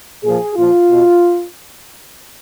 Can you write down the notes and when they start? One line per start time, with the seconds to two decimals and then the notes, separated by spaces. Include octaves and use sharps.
0.23 A#2 F3 G#4
0.56 A#2 F3 F4
0.89 B2